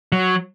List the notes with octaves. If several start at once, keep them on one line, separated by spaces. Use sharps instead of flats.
F#3